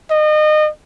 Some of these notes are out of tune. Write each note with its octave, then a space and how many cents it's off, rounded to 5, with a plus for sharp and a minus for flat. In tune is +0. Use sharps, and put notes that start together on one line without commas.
D#5 -30